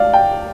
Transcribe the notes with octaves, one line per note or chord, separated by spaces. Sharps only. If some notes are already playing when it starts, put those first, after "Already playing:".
Already playing: D5 F5
G5